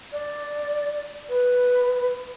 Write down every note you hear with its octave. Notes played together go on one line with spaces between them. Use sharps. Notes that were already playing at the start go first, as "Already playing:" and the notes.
D5
B4